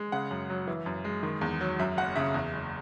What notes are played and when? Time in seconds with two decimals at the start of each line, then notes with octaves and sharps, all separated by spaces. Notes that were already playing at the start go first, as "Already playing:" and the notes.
Already playing: G#3
0.12 C#3 F#5
0.31 F#2
0.50 F#3
0.67 E3
0.86 F#2
1.04 G#3
1.23 D#3
1.41 E2
1.61 F#3
1.79 F#2 E5
1.97 F#1 F#5
2.16 C#3 E5
2.34 E2
2.53 F#1